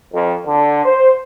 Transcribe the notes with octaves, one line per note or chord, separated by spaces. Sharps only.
F2
D3
C5